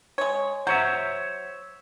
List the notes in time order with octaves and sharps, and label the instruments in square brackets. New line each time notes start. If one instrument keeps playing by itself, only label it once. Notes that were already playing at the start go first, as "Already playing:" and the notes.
[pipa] G#3 C#5
[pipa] F#3 [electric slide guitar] C5 C#5 E5